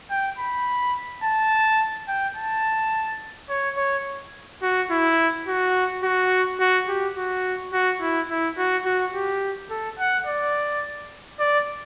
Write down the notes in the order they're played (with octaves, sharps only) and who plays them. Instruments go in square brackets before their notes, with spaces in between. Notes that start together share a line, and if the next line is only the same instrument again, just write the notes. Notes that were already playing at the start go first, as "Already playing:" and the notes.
[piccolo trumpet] G5
B5
A5
G5
A5
C#5
C#5
F#4
E4
F#4
F#4
F#4
G4
F#4
F#4
E4
E4
F#4
F#4
G4
A4
F#5
D5
D5